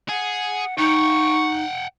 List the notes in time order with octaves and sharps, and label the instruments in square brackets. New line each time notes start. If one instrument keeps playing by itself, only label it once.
[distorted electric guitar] G#4 [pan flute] F#5
[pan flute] D#4 [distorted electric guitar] F#5 G5 [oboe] C#6